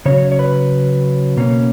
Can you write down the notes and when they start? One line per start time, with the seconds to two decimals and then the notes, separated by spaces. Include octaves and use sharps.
0.05 C#3 F#3 C#4 C#5
0.32 C#5
0.39 B4
1.37 B2 A#3 C#4